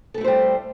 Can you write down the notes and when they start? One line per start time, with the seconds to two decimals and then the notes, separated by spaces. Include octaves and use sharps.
0.14 A4
0.18 A3
0.21 E4
0.24 C5
0.28 G3